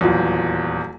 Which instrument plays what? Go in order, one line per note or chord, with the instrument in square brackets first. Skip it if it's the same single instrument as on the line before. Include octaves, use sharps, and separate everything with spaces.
[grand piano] D#1 E2 [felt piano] F#3 F4